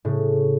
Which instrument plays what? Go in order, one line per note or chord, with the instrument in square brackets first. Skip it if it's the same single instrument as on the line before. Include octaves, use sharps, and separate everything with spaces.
[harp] A2 C#3